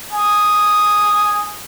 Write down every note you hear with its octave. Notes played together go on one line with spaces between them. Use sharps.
G#5 D#6